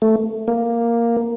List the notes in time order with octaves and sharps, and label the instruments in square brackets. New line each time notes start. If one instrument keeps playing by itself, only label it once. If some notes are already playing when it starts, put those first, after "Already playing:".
[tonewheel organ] A3
A#3